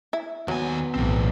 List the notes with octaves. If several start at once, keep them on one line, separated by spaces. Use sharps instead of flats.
E4
D#2 F#3 B3 G#5
B1 A2 E3 C4